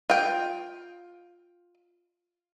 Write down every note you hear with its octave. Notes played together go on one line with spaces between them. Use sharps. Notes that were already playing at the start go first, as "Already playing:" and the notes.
F4 G5